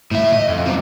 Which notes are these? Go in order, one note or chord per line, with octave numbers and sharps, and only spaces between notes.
A2 E5
D#5
F2
F#2 C3